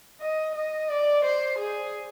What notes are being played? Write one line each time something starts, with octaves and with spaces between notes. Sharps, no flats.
D#5
D#5
D5
C5
G#4